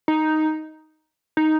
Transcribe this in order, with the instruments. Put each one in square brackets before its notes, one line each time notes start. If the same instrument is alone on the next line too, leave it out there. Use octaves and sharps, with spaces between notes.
[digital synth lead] D#4
D#4